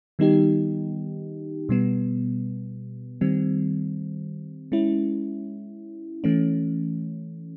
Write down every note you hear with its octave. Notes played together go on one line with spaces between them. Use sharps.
D#3 G3 B3 D#4 G4
B2 G3 B3
D#3 G3 C4
G#3 C#4 E4
E3 A3 C#4